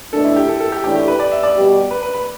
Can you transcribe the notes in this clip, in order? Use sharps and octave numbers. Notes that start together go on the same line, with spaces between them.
B2 A3 D4 A4
E4
G4
A4
A4
G4
A2 E3 A3 D4 G4
G4
B4
D5
E5
D5
B2 G3 B3 G4
B4
B4
B4